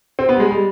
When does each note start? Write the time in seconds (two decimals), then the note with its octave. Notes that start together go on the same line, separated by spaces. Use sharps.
0.19 C4
0.29 B3
0.36 G3
0.40 G#3
0.51 G3